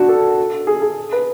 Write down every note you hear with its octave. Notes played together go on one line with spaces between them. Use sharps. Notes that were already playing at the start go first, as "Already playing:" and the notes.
Already playing: D4 F#4
A4
G#4
G#4
B4